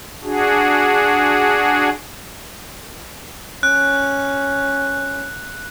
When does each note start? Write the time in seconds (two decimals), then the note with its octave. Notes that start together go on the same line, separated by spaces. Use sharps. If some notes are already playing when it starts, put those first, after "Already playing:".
0.23 D4 F#4 G#4
3.63 C#4 F#6